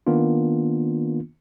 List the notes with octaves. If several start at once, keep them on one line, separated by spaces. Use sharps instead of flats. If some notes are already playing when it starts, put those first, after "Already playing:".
D#3 A#3 B3 D4 F4